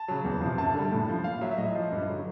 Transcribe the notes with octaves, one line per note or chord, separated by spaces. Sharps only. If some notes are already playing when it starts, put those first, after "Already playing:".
Already playing: A5
C#3 F#3
E2
C3 F3
F#2 A5
D3 G3
A2
F3
A#2 F5
F#3 E5
E5
A2 D#5
F3
G2
D3 F#3